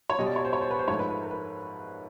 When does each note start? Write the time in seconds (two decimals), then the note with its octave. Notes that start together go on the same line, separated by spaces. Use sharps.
0.10 C#5
0.19 B2 G3 D#5
0.27 D5
0.36 C#5
0.45 C5
0.53 C#5
0.61 C5
0.71 B4
0.79 C5
0.88 G#2 F3 A3 C#5
0.99 B4
1.11 B4
1.23 A#4
1.31 B4